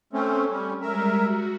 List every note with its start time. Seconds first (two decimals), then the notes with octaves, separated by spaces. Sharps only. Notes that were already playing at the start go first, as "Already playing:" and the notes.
0.13 A3 C4 C#4
0.50 G3 C#4
0.81 G3 G#3 A#4 E5
1.23 F#4